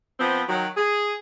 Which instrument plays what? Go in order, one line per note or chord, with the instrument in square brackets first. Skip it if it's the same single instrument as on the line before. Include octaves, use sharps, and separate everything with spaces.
[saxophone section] F3 B3 C4
D#3 F#3
G#4